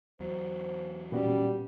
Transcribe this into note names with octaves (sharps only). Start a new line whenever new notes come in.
E2 F#3 C5
A#2 G3 B3 C#4 F#4